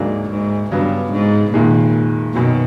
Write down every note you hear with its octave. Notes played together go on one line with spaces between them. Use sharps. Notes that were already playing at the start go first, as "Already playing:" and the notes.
Already playing: D2 G#2 D3 F#3 A#3 D4
G#2
G2 C#3 F#3 B3
G#2
F1 D#2 A#2 D#3 G#3
F#2 B2 D#3 F#3